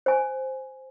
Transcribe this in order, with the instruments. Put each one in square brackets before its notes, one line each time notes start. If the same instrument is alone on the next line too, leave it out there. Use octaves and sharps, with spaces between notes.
[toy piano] C5 G#5